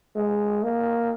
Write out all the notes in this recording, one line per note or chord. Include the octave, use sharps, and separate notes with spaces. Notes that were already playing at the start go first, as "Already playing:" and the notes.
G#3
A#3